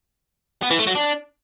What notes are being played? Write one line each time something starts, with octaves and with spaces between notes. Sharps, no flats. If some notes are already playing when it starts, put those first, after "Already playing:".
B3
E3
A3
F#3
D4